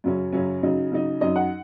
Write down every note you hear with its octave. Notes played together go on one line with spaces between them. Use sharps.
F#2 C#3 F#3 C#4
F#2 C#3 F#3 C#4
C#3 F#3 D#4
C#3 F#3 D#4
F#2 F#3 D#4 D#5
F#5